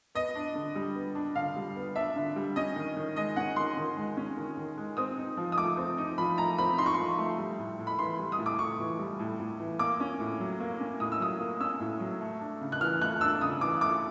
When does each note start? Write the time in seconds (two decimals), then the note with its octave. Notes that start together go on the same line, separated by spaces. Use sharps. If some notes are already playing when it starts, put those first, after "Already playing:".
0.15 B3 D#5
0.35 D4
0.55 D3
0.75 G3
0.95 B3
1.15 D4
1.35 D3 F5
1.56 G3
1.76 B3
1.96 D4 E5
2.16 D3
2.36 G3
2.56 C#4 D#5
2.76 D#3
2.97 D#3
3.16 G#3 D#5
3.36 C#4 F#5
3.56 D#3 C6
3.77 D#3
3.97 G#3
4.17 C#4
4.37 D#3
4.57 D#3
4.77 G#3
4.97 C4 D#6
5.18 D#4
5.37 F3
5.52 D#6
5.58 A3 D6
5.77 C4
5.98 D#4
6.18 F3 B5
6.38 A3 A#5
6.58 C4 B5
6.78 D#4 C6
6.86 C#6
6.94 F3 C6
7.18 A3
7.38 G3
7.59 A2
7.79 A2
7.87 B5
7.99 E3 C6
8.19 G3
8.32 D#6
8.38 A2
8.46 D6
8.59 A2 C#6
8.79 E3
8.99 G3
9.19 A2
9.40 A2
9.59 E3
9.79 A#3 D6
10.00 C#4
10.20 A2
10.40 F#3
10.60 A#3
10.80 C#4
11.00 A2 D#6
11.12 E6
11.20 F#3 D#6
11.40 A#3
11.60 C#4 E6
11.80 A2
12.00 F#3
12.21 A3
12.41 D4
12.61 C#3
12.72 F#6
12.81 E3 F6
13.01 A3 F#6
13.21 D4 E6
13.41 C#3 D#6
13.61 E3 D6
13.81 A3 D6